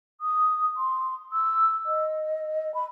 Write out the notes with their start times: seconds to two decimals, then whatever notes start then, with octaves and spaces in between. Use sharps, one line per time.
0.21 D#6
0.77 C6
1.33 E6
1.86 D#5
2.74 B5